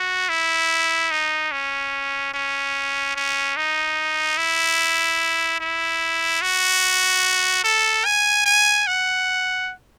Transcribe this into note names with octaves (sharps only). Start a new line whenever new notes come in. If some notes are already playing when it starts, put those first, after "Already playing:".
Already playing: F#4
E4
D#4
C#4
C#4
C#4
D#4
E4
E4
F#4
A4
G#5
G#5
F#5